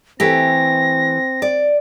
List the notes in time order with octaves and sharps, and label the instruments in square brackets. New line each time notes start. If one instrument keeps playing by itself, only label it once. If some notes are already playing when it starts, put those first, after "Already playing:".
[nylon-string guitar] E3 A3 G4 [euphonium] C4 [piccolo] A#6
[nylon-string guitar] D5